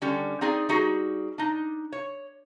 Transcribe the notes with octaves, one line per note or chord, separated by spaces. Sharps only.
D3 G3 C#4
C4 D#4 G#4 D5
G3 D#4 F#4 G#4
D4 D#4
C#5